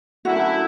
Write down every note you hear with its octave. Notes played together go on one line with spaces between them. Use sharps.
F#2 D3 A3 E4 F#4